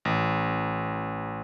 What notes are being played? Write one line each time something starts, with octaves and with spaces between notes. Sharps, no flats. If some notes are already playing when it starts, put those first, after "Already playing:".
A1